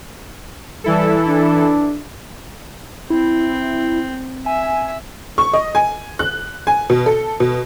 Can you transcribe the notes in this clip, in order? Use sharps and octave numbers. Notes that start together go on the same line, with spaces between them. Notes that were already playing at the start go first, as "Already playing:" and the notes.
E3 G3 E4 A4
D4
C4 E4
E5 G#5
C#6
D#5
G#5
F#6
G#5
B2
A4
B2